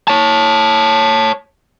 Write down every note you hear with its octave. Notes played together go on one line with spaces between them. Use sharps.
C#5 A5